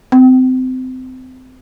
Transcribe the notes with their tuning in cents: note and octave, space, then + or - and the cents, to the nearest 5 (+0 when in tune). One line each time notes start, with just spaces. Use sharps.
C4 -25